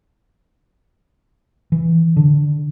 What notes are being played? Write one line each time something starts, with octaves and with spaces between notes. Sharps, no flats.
E3
D3